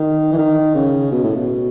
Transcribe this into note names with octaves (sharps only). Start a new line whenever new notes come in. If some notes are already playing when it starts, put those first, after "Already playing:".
Already playing: D#3
E3
D#3
C#3
B2
A2
B2